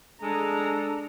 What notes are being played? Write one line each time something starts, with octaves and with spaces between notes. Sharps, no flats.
G#3 D4 A4 A#5